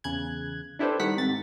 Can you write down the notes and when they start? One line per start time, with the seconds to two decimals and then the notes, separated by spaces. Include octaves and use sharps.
0.04 E2 C#3 F#6 G#6
0.79 D4 E4 G4 A4 B4 C5
1.00 D#3 G3 F#5 B6
1.16 G#2 C3 A6